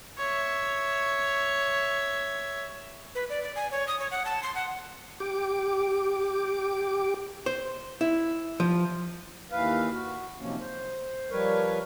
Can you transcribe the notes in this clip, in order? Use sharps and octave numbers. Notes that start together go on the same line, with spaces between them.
C#5 E5
B4
D5
D5
G#5
C#5
D#6
C#5
F#5
A5
C6
F#5
G4 D6
C5
E4
F3
D#2 E3 B4 F5
F#4
C3 D#3 F3 F#3 A#3 C#4
C5
F3 G3 A#4 B4 C#5